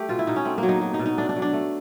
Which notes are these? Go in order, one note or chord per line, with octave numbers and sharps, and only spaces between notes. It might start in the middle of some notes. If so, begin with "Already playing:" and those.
Already playing: A3 G4
B2 F4
E4
B2 D#4
C#4
A3 C4
F#3 A#3
D#4
F#3
D#4
B2
D#4
A3 D4
D4
F#3
D4
A3